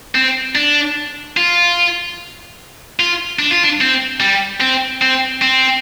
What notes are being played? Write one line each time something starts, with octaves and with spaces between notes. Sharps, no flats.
C4
D4
F4
F4
D4
F4
D4
C4
G3
C4
C4
C4